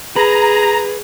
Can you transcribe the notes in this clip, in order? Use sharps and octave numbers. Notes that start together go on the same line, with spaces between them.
G#4 B4 A#5